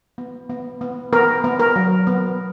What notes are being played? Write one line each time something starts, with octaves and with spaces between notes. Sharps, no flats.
B3
B3
B3
B3 A#4
B3
A#4
F#3
B3